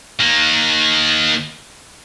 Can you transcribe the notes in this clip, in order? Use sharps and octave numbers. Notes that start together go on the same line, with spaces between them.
D#3 A#3